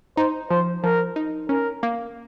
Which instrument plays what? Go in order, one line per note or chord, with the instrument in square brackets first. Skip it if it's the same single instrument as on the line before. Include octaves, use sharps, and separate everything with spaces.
[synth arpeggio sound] D#4 [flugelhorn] C5
[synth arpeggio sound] F3 [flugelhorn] C5
[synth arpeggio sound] F3 [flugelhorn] A#4
[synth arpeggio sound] D#4
[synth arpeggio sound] C#4 [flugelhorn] A#4
[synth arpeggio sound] A#3